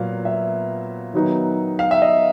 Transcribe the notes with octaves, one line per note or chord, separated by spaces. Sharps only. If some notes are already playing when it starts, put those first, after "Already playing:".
Already playing: A#2 F#3 B3 F5
E5
D#3 F#3 B3 D#4
F5
E5
D#5